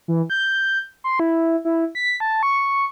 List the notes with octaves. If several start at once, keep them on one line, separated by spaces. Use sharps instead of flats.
E3
G6
C6
E4
E4
B6
A5
C#6